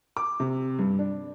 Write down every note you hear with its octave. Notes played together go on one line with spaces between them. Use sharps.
D6
C3
G2
D4